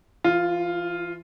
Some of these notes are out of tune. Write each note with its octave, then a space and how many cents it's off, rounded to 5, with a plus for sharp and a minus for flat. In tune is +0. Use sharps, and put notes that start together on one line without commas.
E3 +40 F4 +0